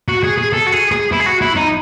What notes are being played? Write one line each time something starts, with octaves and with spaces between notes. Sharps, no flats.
F#4
G#4
G#4
A4
F#4
G#4
G#4
E4
G#4
F#4
E4
D#4